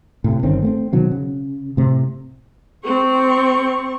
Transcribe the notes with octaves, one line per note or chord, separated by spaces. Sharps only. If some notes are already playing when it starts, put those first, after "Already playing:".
A2 C3
G1 D#3 C4 C#4
A3 A#3 C4
B2 D#3 F#3 C4
C#3
A2 C3
C4 C#6